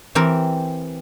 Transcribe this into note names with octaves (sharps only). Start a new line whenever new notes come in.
E3 C4 G4 A#4